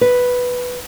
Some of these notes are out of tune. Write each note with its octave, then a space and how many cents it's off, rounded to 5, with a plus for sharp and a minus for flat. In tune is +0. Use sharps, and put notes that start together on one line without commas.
B4 +0